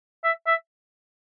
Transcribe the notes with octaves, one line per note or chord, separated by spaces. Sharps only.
E5
E5